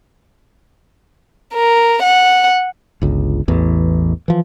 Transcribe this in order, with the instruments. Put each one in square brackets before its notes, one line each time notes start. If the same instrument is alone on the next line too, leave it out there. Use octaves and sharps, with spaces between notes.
[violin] A#4
F#5
[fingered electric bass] G1 C#2
A1 E2 E3
E3 F3